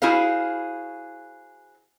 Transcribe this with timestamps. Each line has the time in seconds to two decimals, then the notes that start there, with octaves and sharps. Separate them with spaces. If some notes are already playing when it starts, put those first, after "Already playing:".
0.02 E4 F#4 G#4 C5 F5